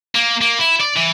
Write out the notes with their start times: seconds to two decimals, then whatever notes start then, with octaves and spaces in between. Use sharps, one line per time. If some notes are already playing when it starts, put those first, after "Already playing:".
0.15 A#3
0.41 A#3
0.59 E4
0.81 D5
0.97 E3